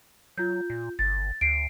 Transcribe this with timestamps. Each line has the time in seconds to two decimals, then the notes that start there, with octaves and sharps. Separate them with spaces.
0.38 F#3 F4 G6
0.70 A#2
0.99 G1 A6
1.41 D2 C7 D7